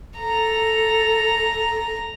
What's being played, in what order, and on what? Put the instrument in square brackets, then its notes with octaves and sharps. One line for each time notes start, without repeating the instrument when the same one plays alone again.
[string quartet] A4 [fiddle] A#5